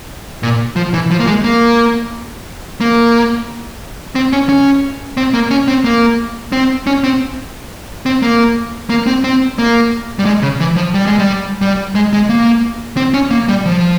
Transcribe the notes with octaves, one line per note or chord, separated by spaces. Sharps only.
A#2
F3
E3
F3
A#3
G#3
A#3
A#3
C4
C#4
C#4
C4
A#3
C#4
C4
A#3
C4
C#4
C4
C4
A#3
A#3
C4
C4
A#3
G3
G#3
C#3
E3
F3
G3
G#3
G3
G3
G#3
G#3
A#3
C4
C#4
A#3
G3
F3